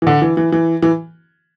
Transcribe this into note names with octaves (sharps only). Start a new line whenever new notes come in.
E3
D3
E3
E3
E3
E3